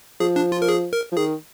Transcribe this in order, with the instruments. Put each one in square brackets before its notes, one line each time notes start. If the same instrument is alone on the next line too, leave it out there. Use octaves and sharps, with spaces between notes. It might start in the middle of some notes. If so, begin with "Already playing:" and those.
[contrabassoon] F3 [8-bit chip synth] G#4
[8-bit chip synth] D4
F4
A#4
G#4
A#4
[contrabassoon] F3
[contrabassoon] D#3 [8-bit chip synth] G#4